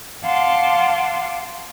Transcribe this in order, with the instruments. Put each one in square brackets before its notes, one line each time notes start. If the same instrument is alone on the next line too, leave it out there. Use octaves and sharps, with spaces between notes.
[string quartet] F5 F#5 A5 C6 D6